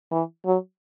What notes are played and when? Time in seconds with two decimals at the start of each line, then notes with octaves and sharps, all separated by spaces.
0.12 E3
0.46 F#3